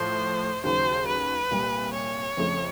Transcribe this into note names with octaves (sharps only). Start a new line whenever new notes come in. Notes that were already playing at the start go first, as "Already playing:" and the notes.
Already playing: A2 F3 A3 C5
D#2 C#3 F#3 C5
B4
C2 A#2 G3
C#5
F2 C#3 F3 A3